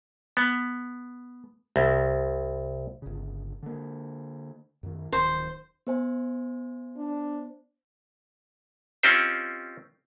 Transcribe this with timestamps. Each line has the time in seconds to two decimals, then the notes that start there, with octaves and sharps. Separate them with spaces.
0.37 B3
1.76 C2
3.02 G1 C#3
3.63 D3 A#3
4.83 F#2 D#3
5.12 D1 D#3 C5
5.87 B3 C5 G#5
6.97 D4
9.03 C4 C#4 D#4 F4 G4 C5